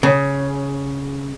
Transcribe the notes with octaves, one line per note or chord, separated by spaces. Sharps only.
C#3